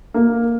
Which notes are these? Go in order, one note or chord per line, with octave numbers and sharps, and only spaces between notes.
A#3